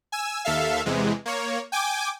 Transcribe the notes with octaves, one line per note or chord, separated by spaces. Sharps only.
G#5 E6
D#2 A4 E5 F5
E2 C3 E3 G#3
A#3 C#5
G5 G#5 D6